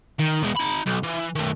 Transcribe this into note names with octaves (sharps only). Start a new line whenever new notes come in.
D#3
E2 G#3
D#4 B5
B1
E3
D#3 A3